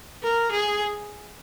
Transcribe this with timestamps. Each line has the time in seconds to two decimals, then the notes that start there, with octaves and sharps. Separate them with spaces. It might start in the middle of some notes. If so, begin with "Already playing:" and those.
0.23 A#4
0.51 G#4